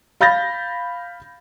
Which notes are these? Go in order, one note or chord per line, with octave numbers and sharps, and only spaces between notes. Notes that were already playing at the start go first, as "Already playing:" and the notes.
F5 B5 G6 A6 A#6